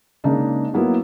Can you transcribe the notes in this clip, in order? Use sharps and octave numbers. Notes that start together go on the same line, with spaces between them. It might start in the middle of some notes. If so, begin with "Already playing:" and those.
C#3 G#3 A#3 D4 D#4
F#3 A#3 B3 E4 F#4